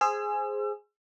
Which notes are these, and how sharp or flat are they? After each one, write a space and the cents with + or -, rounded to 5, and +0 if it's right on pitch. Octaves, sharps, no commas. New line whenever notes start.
G#4 +0 C5 +0 E6 +35